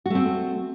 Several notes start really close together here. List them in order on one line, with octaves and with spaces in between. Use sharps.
F#4 A3 C4